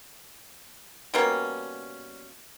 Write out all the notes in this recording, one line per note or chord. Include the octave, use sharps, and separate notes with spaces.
B2 G3 A#3 C#4